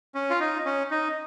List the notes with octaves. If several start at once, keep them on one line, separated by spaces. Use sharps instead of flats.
C#4
F4
D#4
C#4
D#4